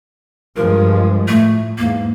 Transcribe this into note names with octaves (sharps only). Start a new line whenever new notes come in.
G2 F3 G#3 A#4
A2 A3
E2 G#2 A#3